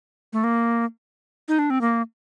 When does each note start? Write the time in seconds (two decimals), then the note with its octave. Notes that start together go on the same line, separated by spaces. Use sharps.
0.33 A3
0.44 A#3
1.48 D#4
1.59 D4
1.70 C4
1.81 A#3